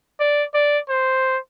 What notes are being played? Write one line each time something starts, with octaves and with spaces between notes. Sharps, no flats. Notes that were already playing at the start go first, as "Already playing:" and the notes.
D5
D5
C5